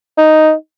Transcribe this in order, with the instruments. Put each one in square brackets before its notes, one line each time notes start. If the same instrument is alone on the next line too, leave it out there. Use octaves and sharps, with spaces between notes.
[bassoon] D#4